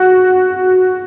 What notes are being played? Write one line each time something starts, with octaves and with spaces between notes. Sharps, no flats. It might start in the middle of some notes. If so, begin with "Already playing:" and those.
Already playing: F#4